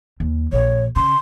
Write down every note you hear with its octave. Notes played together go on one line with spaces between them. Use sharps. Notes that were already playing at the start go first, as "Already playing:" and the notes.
D#2
A#1 C#5
C#3 C6